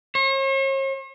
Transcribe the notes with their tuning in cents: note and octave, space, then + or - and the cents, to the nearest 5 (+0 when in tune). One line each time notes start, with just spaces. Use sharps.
C#5 -45